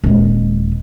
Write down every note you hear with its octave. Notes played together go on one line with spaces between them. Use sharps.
D#1 G#3